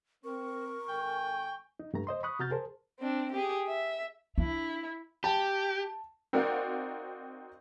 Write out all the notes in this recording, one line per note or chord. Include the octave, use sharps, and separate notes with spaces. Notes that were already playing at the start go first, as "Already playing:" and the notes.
C4 A#4 C#6
G#1 A4 G5 G#5
D#4
G2 A3 A#5
C5 D#5 C6
B5 C#6 D#6 F#6
C3 F#4 A#5 F6 G6 A6
G#4 A#4 C5 A5
C4 D4
G4 G#4
E5
D4 E4
G4 A5
C4 D#4 F#4 A#4 D5 F5